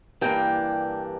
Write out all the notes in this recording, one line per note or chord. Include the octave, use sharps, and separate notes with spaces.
G2 E3 A#3 D4 G5